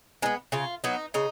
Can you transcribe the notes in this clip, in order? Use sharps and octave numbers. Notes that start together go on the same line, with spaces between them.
G#3 B3 D#4
C#3 F4
F#3 B3 D#4
C#3 D#4